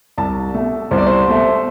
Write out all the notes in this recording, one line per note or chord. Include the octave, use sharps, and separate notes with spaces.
C2 A5
B2 A3
C2 C5
D5
C5
B2 A3